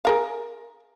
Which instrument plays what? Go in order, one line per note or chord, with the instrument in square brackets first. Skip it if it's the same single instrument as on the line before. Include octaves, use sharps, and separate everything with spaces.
[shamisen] G#4 A#4 F5